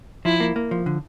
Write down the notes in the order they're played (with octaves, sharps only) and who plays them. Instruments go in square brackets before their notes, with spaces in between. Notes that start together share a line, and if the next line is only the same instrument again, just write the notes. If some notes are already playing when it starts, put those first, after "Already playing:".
[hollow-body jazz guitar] F3 [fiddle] E4
[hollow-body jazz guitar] A#3
A#3
F3
D3